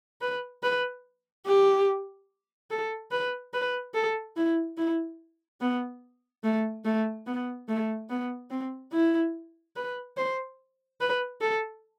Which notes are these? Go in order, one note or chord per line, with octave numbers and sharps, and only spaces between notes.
B4
B4
G4
A4
B4
B4
A4
E4
E4
B3
A3
A3
B3
A3
B3
C4
E4
B4
C5
B4
A4